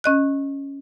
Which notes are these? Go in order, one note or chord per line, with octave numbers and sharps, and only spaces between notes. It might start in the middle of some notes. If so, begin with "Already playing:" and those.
C#4 D#5 F#6